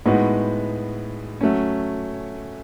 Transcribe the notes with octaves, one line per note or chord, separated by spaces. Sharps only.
A2 G#3 B3 D#4 F#4
F#3 A3 C#4